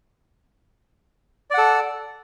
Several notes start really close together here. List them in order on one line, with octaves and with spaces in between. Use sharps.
D5 F#5 A4